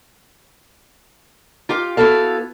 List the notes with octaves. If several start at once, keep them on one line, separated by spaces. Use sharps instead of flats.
F4 G4 F5 G5
B3 E4 F#4 A4 F5